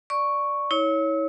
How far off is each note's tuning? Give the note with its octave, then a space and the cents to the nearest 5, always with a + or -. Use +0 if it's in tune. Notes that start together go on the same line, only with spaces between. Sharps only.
D5 +0 C#6 +0
E4 -40 C#5 +0